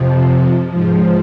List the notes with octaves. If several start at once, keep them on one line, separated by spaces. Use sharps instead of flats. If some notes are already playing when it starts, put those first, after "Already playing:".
Already playing: F2 C3 F3
G#2 F3